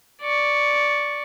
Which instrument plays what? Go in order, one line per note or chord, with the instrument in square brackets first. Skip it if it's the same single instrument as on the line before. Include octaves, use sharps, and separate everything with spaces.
[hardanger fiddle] D5 C#6